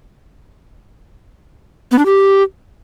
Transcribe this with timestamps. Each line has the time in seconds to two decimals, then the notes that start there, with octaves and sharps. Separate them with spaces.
1.92 B3
1.99 D4
2.06 G4